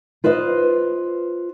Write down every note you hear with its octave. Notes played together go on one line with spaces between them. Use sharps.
F4 B4 C5 D5 D#5